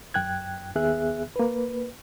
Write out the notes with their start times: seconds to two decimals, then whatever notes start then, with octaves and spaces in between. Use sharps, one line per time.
0.14 F#2 G5 F#6 G#6
0.75 D#2 B3 G#4 E5 F#6
1.36 A#3 B4